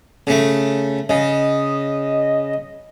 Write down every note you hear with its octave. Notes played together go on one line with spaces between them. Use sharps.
C#3 A3
C#3 D#5